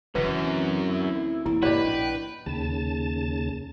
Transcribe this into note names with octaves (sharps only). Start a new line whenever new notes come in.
D1 F#2 C#3 E3 F#4 B4
D2 C4
E4
E1 A#3 E4
G#2 C#3 A#3 F#4 G4 B4 D5 D#5
A#1 D4 G5
D#2 C#3 A5